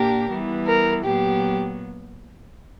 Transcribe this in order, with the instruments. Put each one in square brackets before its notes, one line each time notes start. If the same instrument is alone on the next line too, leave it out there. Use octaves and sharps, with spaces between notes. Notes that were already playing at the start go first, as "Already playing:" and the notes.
Already playing: [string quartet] A#2 A#3 D4 A#4 [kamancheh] G4
[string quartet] E3 G3 B3
[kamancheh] A#4
[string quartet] A#2 F#3 B3 [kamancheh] G4